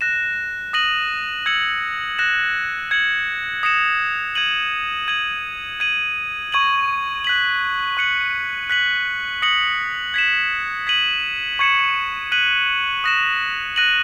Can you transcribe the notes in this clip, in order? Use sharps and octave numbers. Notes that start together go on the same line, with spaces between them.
F#6 A#6 E7
D#6 A#6 D#7 F#7
E6 G#6 C#7 F#7
F#6 A#6 E7
G#6 C#7 F#7
D#6 A#6 C#7 E7
G#6 D#7 F#7
G#6 D#7 F#7
G#6 D#7 F#7
C#6 G#6 D#7 F#7
F#6 B6 F#7
C#6 F#6 C#7 F#7
F#6 B6 F#7
D#6 A#6 C#7 F#7
G#6 B6 E7
G#6 B6 D#7 F#7
C#6 G#6 C#7 E7
F#6 B6 D#7 F#7
D#6 F#6 A#6 E7
F#6 A#6 D#7 F#7